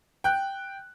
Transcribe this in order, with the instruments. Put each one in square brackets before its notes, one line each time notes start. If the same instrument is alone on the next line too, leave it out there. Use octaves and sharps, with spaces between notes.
[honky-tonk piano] G5 F#6